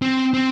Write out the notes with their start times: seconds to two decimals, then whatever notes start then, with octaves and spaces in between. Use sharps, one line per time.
0.02 C4
0.34 C4